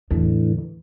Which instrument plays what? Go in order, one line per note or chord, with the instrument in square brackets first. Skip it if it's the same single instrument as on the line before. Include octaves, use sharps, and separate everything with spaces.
[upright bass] E2 [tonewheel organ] A2 D3 E3